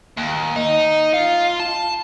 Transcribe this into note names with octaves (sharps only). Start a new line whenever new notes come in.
D#2
D#4
F4
A5